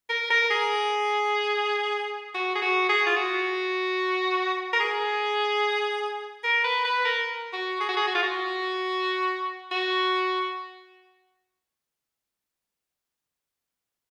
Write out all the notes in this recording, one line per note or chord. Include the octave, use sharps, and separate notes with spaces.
A#4
A#4
G#4
F#4
G#4
F#4
G#4
F4
F#4
A#4
G#4
A#4
B4
B4
A#4
F#4
G#4
F#4
G#4
F#4
F4
F#4
F#4